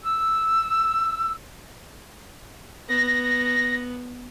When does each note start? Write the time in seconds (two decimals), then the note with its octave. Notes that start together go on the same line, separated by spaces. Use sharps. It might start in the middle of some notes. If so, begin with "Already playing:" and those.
0.03 E6
2.89 B3 A#6